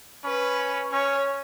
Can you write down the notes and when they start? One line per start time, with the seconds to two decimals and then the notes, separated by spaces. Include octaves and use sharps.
0.25 C#4 B4
0.92 C#4 C#5